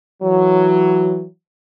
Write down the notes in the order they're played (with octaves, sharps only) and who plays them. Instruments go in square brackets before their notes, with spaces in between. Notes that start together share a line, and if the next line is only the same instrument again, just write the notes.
[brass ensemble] E3 F#3